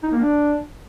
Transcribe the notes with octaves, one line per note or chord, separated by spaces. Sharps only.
D#4
A#3
D4